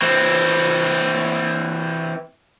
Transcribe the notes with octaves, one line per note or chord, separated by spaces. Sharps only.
E3 C4